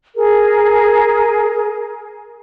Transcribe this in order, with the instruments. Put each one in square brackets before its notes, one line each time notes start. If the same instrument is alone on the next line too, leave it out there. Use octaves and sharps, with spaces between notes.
[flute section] G#4 A#4